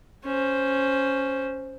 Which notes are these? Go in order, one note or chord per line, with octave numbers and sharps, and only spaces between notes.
C#4 C5